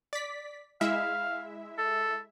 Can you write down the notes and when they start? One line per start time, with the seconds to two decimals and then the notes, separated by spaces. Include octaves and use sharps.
0.13 D5 B6
0.81 G#3 E4 E5 F5
1.78 A4